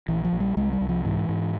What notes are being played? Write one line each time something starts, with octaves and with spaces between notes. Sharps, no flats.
A#1 E3
F3
A#1
G3
C2 G#3
G3
C2
F3
G#2 E3
G#2